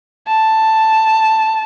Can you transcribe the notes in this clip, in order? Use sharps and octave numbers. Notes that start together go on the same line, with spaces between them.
A5